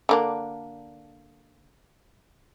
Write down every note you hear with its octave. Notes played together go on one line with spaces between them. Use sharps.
D3 A#3 D4